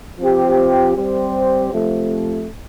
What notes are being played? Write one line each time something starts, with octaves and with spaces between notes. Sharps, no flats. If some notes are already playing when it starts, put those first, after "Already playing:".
F3 C4 G4
G3 C4 G4 C5
C3 F3 A3